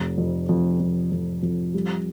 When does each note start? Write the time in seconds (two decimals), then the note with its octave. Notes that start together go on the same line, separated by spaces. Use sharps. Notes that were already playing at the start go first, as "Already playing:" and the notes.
Already playing: F1
0.18 F2
0.49 F2
0.80 F2
1.12 F2
1.43 F2
1.74 G3